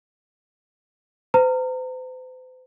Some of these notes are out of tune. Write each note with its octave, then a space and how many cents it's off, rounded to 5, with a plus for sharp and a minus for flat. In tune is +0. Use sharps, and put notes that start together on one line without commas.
C5 -45 A#5 -30